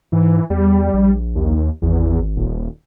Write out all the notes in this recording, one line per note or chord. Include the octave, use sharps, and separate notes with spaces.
G#2 E3
E2 G3
A#1
D#2
G#1 E2
D#1